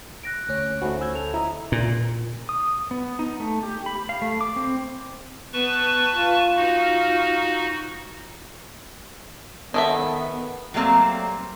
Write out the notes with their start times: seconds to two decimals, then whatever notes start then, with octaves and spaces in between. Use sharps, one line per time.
0.23 F#6 A#6 D7
0.49 D2 C#4
0.82 A3 D#4 F#4 C5 G#5 B5
1.01 E6 G6 G#6
1.15 A4 F7
1.34 E4 D#5 A#5
1.72 A#2
2.49 D#6
2.91 B3
3.19 D#4
3.40 A3
3.63 G4
3.86 B5
4.09 F5
4.22 A3
4.41 D6
4.56 C4
5.53 B3 B4 A5 C#6
6.13 F4
6.57 D#4 F#4
9.74 D#3 B3 A4 E5
10.74 F#3 G3 A3 A#3 C4